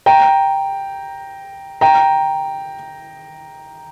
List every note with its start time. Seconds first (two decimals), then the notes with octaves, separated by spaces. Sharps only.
0.06 G5 A#5
1.81 G5 A#5